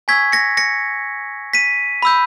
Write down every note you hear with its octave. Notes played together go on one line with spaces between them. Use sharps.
G#5 C#6 E6 G#6 B6
A#6 C#7
A#6 C#7
B6 D#7
B5 E6 G6